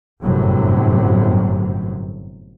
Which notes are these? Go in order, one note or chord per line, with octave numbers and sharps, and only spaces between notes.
G1 F#2 A2 C3 F#3